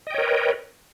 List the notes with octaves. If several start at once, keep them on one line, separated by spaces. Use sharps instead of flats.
A#4 B4 C#5 D#5 G5